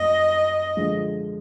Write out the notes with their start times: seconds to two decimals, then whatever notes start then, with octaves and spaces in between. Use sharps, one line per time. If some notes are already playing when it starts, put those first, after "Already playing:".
Already playing: F#2 G3 A#3 D#5
0.77 D3 F3 G#3